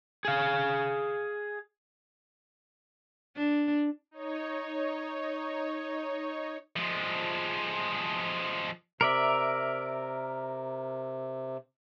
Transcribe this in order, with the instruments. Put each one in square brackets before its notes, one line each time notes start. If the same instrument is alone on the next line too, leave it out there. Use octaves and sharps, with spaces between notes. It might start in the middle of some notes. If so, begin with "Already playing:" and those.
[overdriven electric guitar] G#4 F5
[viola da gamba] D4
[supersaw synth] D#4 C#5
[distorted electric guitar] F3 G#3
[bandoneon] C3 [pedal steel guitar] A#4 D5 E5